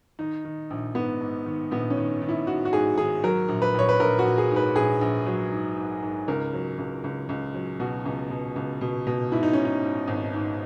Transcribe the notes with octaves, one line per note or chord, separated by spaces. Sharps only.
D#3 D#4
D#3
A#1
G#2 B3
G#2
D#3
A#1 B3
C#4
D#3
D#3
E4
D#3 F#4
F#4
G#2 G#4
D#3 G#4
F#3 A#4
A#1
B4
A#1 C#5
B4
A#1 A#4
F#4
A#1
G#4
G#2
B4
A#1 G#4
A#1
F#3
G#2
G#2
G#2
C#2 A#4
F#3
C#2
C#2
C#2
F#3
B2 F#4
C#2
B2
C#2
B2
B2
G#2 E4
D#4
G#2 C#4
D#4
G#2
G#1
G#2